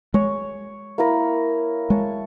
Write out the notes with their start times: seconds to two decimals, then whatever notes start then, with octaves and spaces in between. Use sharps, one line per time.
0.14 G#3 C#5
0.98 A#3 E4 A#4
1.90 G#3 C#5 A5